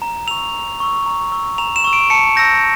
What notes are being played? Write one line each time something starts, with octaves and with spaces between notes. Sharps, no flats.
A#5
C#6 E6 F7
A#5
C#6 E6
A#5
C#6 E6
A#5 F7
E7
C#6 E6
D7
A5 C#7
E6 G6 A#6